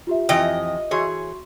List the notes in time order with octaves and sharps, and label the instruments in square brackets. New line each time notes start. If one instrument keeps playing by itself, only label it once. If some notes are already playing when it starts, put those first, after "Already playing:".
[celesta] F4 G4 E5
[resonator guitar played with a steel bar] F2 E3 G5 [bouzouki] D#5
[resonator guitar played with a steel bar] E3 G#4 C#5 [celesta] F#4 C6 C#6